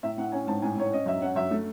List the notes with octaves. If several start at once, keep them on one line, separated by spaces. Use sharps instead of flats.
A2 E5
A2 F#5
C#4 G#5
G#2 A5
A2 G#5
A2 C#5
C#4 D#5
F#2 E5
C#4 F#5
F#2 E5
A3